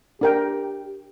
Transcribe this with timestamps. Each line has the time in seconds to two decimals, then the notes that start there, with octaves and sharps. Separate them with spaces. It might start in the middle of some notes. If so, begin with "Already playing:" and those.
0.21 D4 G4 A#4 G5